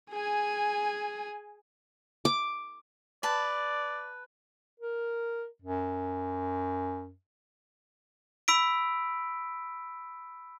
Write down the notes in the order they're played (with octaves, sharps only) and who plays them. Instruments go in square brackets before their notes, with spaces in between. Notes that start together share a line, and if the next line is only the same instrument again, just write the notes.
[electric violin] G#4 G#5
[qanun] D6
[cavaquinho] B4 A5 [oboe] D5
[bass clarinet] A#4
F#2
[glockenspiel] B5 E6 B6 D7